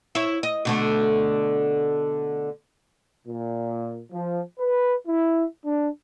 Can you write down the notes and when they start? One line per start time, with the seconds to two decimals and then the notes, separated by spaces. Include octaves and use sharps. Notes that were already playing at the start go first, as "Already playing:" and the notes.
0.15 E4 C#5
0.43 D#5
0.65 B2 D3 A3
3.27 A#2
4.12 F3
4.58 B4
5.07 E4
5.65 D4